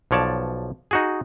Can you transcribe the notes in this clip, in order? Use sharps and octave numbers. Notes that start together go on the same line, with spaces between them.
B1 F3 C#5 D5 A5
D#4 F#4 G#4